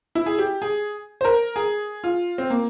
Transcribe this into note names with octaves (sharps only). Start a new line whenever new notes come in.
E4
G#4
G4
G#4
C5
A#4
G#4
F4
C4
A#3